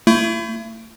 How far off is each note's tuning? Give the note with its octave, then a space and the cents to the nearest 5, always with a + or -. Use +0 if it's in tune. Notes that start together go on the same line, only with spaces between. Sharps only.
A3 +35 E4 +35